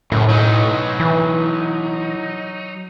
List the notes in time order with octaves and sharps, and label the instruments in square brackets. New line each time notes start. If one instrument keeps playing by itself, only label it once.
[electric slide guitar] F#2 C#3 [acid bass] A2
[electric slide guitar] F#3 D#4
[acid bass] E3